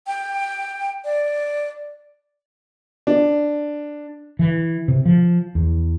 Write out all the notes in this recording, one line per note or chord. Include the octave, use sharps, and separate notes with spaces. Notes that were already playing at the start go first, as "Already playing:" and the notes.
G5
D5
D4
E3
C3
F3
E2